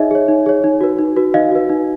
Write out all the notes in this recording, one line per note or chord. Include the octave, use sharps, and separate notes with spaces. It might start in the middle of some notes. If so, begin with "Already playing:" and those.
Already playing: D#4 G#4 C#5 D#5 E5
G#4 C#5
D#4
G#4 C#5
D#4
F#4 B4
D#4
F#4 B4
D#4 D#5 F5
F#4 B4
D#4